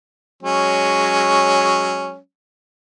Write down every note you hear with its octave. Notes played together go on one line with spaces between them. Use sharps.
F#3 G#3 C#4